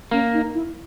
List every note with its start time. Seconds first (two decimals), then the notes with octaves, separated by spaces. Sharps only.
0.11 A#3 C#4
0.33 D#4
0.54 E4